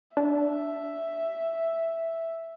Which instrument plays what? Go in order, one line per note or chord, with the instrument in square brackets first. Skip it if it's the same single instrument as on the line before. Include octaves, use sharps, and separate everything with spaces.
[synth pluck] D4 [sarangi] E5